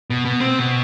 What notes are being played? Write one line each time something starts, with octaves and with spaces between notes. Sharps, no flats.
B2
B2
C4
B2